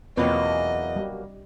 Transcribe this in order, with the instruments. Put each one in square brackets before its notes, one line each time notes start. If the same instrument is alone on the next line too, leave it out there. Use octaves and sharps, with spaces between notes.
[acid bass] E2 [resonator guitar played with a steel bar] B2 F#3 A#3 [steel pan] C4 F4 B4 [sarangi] D#5
[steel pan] G3